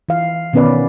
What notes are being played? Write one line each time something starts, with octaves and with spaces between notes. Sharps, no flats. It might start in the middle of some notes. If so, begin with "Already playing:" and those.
E3 F5
B2 D#3 B3 C#4 B4 D5